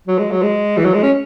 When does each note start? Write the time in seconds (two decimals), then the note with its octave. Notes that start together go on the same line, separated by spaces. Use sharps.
0.07 F#3
0.18 G#3
0.31 F#3
0.42 G#3
0.77 E3
0.85 F#3
0.94 G#3
1.03 C#4